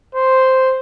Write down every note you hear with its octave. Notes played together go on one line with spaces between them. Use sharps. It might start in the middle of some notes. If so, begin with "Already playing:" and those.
C5